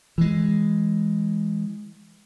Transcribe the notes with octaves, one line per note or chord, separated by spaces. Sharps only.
E3 G#3